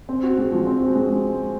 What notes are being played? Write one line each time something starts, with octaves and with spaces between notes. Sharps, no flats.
C4
F#4
G#3
F3
C4
F#4
G#3